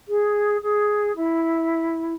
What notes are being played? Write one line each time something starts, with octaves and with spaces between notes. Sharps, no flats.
G#4
G#4
E4